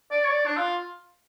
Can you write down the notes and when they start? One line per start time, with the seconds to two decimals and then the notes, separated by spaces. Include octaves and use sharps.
0.11 D5
0.24 C#5
0.30 D5
0.46 D4
0.57 F4